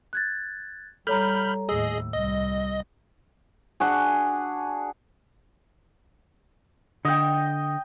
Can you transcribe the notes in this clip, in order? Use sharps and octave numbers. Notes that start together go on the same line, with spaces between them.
F#6 G#6 A6
G3 A4 C#5 A#5 B5 F6 G6
D#2 A2 G#4 D#5 E6
C2 G3 D#5
D4 F#4 G#4
D3 D#5 G5